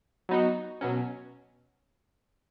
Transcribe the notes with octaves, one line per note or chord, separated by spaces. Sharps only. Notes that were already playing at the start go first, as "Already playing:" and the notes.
F#3 B3 D#4 F#4
B2 F#3 C#4